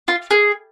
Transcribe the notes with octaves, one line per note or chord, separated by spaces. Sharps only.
F4
G#4